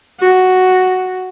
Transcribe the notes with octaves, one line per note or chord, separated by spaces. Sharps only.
F#4